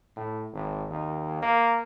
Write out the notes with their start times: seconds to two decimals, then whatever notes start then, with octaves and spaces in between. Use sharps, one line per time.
0.16 A2
0.53 G#1
0.89 D#2
1.42 A#3